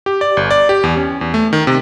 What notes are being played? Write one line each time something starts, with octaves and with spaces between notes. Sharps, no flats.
G4
D5
G1
D5
G4
E2
C#4
E2
A3
D#3
C3